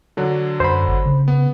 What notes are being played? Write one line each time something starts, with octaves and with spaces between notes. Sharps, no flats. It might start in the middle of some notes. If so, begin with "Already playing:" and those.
D3 F#3 D4
F#2 C5 B5
G1
C#3
B3